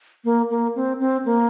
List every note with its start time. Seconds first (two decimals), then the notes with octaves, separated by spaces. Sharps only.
0.25 A#3
0.50 A#3
0.76 C4
1.00 C4
1.25 A#3